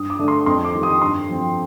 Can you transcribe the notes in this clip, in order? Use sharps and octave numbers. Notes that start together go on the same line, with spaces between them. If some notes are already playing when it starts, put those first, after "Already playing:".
Already playing: G2 D#6
D6
D3 A3 D4
C6
F2 C6
D6
D#3 G3
D#6
G2 C6
F3 C4